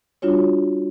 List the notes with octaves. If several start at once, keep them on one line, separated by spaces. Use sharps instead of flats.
G3 D4 F4 F#4 C#5